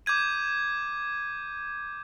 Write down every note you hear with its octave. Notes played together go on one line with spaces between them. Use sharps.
D6 G6 G#6 D#7